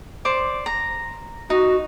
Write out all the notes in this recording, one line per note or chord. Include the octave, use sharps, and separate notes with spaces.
C5 D5 D6
A#5
D#4 F#4